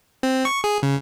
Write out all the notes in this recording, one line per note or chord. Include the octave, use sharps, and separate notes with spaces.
C4
C#6
G#4
C#3